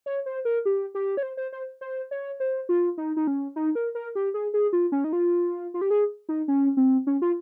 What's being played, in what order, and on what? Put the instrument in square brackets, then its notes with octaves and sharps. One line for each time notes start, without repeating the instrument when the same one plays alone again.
[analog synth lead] C#5
C5
A#4
G4
G4
C#5
C5
C5
C5
C5
C#5
C5
F4
D#4
D#4
C#4
D#4
A#4
A#4
G4
G#4
G#4
F4
C#4
D#4
F4
F4
G4
G#4
D#4
C#4
C4
C#4
F4